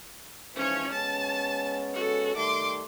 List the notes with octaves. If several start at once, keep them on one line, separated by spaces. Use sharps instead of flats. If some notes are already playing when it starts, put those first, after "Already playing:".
G#2 E3 F3 C#4 C#5
G#3 B3 C#4 A5
F#4 A4
D#3 G3 A3 C6 D6